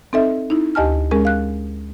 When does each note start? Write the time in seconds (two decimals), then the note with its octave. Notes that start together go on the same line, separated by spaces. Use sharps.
0.13 C4 D#4 A4 D#5 E5
0.50 D#4 E4
0.75 D2 G4 D#5 G#5 A5 F6
1.11 G#3 C#4 G#4 A#4
1.25 F5 F#6